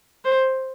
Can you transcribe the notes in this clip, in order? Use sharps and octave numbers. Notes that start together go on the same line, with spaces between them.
C5